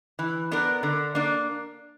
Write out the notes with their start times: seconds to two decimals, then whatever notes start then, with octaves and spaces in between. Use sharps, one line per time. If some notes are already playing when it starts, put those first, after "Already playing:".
0.19 E3
0.51 B3 D4 A#4
0.83 D3
1.15 A#3 D4